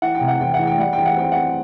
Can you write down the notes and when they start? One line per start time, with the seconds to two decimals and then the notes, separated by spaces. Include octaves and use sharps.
0.02 E3 F#5
0.15 G5
0.21 C3
0.28 F#5
0.40 E2 G5
0.54 F#5
0.59 E3
0.67 G5
0.78 G3 F#5
0.93 E2 G5
1.06 F#5
1.16 C4 G5
1.32 C4 F#5